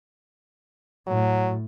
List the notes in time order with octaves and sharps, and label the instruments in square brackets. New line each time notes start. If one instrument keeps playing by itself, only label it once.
[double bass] A2 [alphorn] F#3